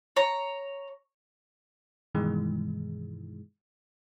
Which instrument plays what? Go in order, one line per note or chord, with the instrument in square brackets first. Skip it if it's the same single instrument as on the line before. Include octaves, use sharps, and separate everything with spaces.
[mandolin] C#5 A#5
[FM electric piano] G2 B2 D#3 E3 G#3